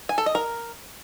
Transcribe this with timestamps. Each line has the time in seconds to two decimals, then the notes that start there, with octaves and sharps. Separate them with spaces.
0.09 G#5
0.18 A4
0.26 D#5
0.35 A#4